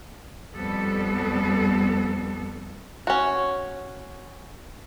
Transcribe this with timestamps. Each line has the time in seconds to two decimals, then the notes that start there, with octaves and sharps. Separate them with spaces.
0.55 F2 G3 B3 A4
3.07 C#4 F#4